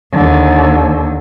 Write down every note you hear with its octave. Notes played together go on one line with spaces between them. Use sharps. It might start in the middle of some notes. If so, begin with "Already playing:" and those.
D#2 D3